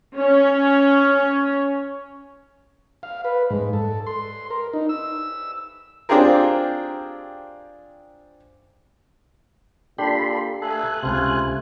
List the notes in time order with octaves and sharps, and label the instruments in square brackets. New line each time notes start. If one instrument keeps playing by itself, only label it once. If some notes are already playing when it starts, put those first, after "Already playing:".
[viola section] C#4 C#5
[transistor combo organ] F5
B4
G#2
A4
C6
A#4
D#4
E6
[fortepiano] C4 D4 F4 G4 G#4 A#4
[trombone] A#2 [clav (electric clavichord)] D4 G4 [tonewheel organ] A4 B5 C6
[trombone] A3 [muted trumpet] A4 [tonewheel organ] G#5 F#6
[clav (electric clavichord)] C#2 C3 [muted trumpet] F4